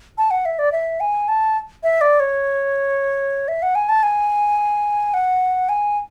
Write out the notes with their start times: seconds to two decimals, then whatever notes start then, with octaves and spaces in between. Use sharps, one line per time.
0.18 A5
0.31 F#5
0.45 E5
0.59 D5
0.72 E5
1.00 G#5
1.28 A5
1.83 E5
2.01 D5
2.20 C#5
3.48 E5
3.62 F#5
3.75 G#5
3.89 A5
4.03 G#5
5.14 F#5
5.69 G#5